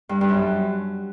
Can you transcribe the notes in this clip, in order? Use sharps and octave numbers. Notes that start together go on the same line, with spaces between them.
G2
G2
F#2